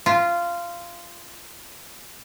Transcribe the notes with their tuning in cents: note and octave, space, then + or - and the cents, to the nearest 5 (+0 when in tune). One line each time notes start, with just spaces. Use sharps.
F4 -15